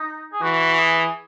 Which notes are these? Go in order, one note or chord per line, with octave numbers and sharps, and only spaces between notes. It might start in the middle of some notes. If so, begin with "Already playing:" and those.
Already playing: D#4
G#4
E3 F#4
G#4